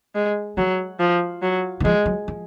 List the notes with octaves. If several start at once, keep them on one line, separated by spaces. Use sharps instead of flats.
G#3
F3 F#3
F3
F#3
D#3
F3 G#3
F#3
F3